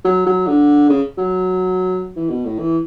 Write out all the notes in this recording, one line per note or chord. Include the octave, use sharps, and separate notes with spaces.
F#3
F#3
D3
C#3
F#3
E3
B2
A2
E3